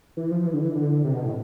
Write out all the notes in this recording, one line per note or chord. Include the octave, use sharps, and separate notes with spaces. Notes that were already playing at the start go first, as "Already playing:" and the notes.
E3
F3
E3
D3
E3
D3
C3
B2
A2